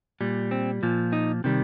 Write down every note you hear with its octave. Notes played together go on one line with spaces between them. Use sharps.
A#2 G3
C4
A#2 F3
D#4
C3 D#3 G3